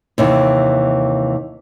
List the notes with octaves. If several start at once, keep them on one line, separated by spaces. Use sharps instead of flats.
D#2 C3 E3